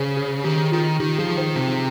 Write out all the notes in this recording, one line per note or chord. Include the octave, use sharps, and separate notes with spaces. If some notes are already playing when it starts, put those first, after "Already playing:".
Already playing: C#3 G#4 C5 C#5
G#4
D#3 G4
D#3 F4
D#3 G4
F3 G#4
D#3 C5
C3